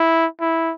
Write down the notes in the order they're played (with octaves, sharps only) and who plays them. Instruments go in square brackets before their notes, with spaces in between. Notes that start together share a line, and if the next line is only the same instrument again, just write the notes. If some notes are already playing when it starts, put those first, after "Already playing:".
Already playing: [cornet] E4
E4